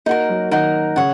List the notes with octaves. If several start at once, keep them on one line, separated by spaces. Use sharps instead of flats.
A#3 D#4 F#4 A#4
F#3
D#3 D#4 F#4 A#4
C#3 C#5 F#5